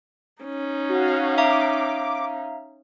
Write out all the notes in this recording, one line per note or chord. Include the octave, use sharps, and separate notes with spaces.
C#4 D#4
F#4 F5
E5 F5 A#5 D6